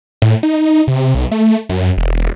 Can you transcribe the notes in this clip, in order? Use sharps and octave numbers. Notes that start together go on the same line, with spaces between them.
A2
D#4
C3
B1
A3
F#2
E1